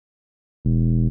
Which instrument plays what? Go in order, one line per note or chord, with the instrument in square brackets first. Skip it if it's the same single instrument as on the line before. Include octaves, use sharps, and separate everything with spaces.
[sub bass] E1